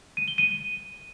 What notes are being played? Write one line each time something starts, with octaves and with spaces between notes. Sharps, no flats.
D#7
G7
D#7